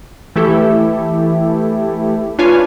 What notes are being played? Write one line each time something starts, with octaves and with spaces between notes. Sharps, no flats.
E3 A3 E4 G4 A4
D4 F4 B4 C#5 F5 G#5